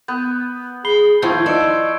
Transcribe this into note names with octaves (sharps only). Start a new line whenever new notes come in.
B3 G6
G#4 B5 C7 G7
D#2 D#3 F3 E4 F4 C#6 G6 G#6
D5 D#5 E6 C#7 E7